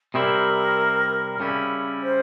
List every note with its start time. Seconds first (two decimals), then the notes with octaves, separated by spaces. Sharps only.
0.14 C3 G3 C4 E4 A#4
1.40 C#3 G3 C#4 E4
2.03 C5